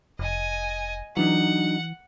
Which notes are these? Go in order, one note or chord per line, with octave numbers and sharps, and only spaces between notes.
F1 D#5 G#5
E3 F#3 D4 D#4 F#5